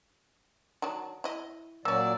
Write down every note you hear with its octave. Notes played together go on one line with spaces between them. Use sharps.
D#3 F#3 D4
E4 D#5
A#2 F#3 A#3 C#4 D5 E6